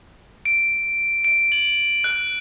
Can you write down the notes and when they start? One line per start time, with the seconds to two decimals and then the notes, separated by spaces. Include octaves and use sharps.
0.45 D7
1.25 D7
1.52 F#7
2.04 F#6